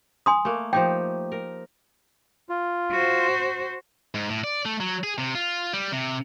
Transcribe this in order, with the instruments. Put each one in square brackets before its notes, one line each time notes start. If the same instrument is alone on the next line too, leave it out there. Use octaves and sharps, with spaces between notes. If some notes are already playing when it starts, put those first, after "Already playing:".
[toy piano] G#5 C6 D#6
[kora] A3 A#3
[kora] F3 D#4 G4 [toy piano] G5
[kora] A#4
[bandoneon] F4
[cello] F#4 C5
[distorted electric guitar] G#2
A2
D5
A3
F#3
G#4
C3
F4
G3
C3